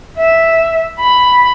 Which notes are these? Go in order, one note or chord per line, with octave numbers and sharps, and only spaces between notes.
E5
B5